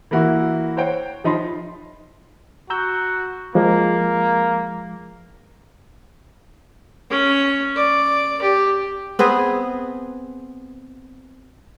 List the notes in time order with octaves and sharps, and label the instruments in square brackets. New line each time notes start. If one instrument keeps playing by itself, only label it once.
[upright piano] E3 A#3 E4 F#4
C5 C#5 F#5 G5
F3 D#4 B5 C6
[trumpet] F#4 [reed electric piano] A#5 E6 G6
[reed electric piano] F3 G#3 [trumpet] A#3
[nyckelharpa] C#4
D5
G4
[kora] B3 C4 G#4 B4